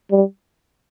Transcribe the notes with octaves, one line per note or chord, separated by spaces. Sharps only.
G3